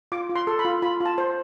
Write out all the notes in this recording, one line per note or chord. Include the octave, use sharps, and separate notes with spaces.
F4 D6
F4
C6
A4
B5
F4
F4 B5
F4
A5
C5